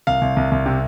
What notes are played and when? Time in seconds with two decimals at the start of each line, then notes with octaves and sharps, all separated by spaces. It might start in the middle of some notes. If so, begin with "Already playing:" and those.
0.07 C2 F5
0.21 C2
0.36 C2
0.51 C2
0.66 C3